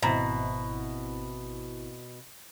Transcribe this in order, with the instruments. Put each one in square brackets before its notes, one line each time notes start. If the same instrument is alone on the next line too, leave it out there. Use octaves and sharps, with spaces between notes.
[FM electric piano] G#1 C4 E4 [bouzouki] B2 [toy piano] D#5 A#5